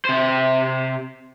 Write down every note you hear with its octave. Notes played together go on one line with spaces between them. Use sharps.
C3 C5